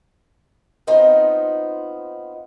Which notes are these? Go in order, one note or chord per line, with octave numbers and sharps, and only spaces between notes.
B3 C4 D#4 F4 C5